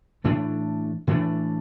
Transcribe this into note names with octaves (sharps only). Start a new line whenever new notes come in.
A2 E3 A3 D4
A2 E3 A3 D4